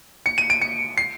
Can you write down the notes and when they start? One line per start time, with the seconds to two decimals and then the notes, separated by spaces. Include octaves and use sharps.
0.26 C#7
0.38 D#7
0.50 D7
0.61 C#7
0.98 C7